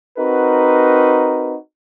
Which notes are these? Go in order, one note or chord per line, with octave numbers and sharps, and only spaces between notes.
C4 D#4 F#4 A#4 B4